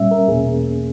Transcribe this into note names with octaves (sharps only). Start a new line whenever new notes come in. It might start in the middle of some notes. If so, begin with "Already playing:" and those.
Already playing: A#2 G3 C#4 E5
A#4
E2 B2 A#3 C#4 G#4